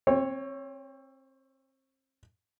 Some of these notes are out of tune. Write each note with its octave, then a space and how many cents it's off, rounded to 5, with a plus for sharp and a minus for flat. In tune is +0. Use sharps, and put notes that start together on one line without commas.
C4 +30 C#5 +0